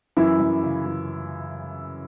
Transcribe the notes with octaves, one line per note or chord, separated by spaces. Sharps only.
F#2 E3 E4
F#2
C#3
E3